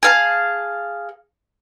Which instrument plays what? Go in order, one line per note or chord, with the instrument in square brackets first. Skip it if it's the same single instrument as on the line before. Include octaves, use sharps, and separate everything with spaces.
[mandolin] G#4 F5 A5